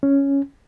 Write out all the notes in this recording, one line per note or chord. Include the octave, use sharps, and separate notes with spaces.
C#4